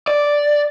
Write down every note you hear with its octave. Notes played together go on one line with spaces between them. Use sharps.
D5